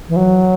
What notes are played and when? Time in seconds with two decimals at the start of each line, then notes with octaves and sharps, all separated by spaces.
0.09 E3
0.16 F#3